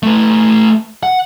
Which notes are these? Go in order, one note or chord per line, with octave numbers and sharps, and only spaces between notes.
A3 B4
F#5